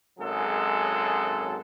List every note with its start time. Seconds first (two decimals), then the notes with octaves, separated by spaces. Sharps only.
0.20 G#1 F#2 F#3 G#3 G#4 A4